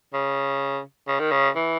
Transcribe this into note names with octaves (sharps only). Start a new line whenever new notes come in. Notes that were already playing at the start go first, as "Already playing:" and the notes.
C#3
C#3
D#3
C#3
E3